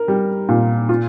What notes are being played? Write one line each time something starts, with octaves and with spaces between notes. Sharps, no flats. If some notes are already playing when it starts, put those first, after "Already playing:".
Already playing: A#4
G3
A#2
F4